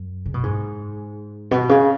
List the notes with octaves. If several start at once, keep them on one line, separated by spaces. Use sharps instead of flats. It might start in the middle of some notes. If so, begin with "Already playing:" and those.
Already playing: F#2
C#3
B2
G#2
B2
C#3